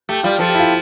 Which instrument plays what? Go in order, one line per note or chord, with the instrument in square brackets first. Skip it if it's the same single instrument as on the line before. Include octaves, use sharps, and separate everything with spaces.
[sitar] A3 [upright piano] G4
[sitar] G3 [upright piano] F4
[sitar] F3 [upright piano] A4
[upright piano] G4
E4
F4